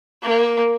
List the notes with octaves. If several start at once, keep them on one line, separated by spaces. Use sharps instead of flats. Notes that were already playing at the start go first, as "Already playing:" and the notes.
A#3